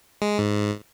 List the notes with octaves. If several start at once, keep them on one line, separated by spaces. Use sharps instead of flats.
G#3
G#2